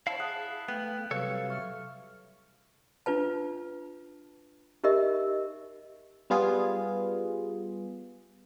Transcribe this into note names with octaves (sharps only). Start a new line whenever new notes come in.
E4 C5 C#5 F5 A5
G#4 F#5 A5 D#6 F#6
A3 B3 F5 G5 F#6
C3 F#3 G3 A4 B4 C#5 F5
E5 C#6 F6
D4 F4 B4 A5
D#4 G4 A#4 D#5 E5
G3 B3 F4 G#4